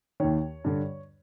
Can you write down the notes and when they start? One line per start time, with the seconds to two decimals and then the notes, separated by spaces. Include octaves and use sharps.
0.20 D#2 D#3 C#5
0.64 G2 D3